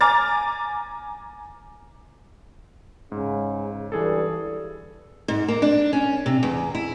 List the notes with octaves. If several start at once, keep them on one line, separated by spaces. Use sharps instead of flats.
G#5 A#5 D6 F6 A6
G#2 C#3
G2 E3 G#4 A4
G#2
A#3
D4
C#4
C3
E2
E4